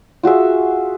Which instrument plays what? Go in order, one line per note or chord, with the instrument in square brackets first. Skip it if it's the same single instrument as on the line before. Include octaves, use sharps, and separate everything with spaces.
[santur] F4 F#4 G#4 E5